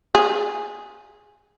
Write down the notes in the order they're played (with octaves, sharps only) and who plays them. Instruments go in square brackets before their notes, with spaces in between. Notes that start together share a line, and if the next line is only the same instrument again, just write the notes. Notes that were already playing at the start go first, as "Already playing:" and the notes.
[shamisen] G#4